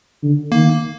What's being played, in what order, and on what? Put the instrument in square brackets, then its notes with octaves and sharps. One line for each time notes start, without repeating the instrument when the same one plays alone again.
[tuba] D3
[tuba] D#3 [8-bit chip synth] A#3